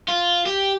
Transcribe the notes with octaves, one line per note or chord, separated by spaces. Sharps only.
F4
G4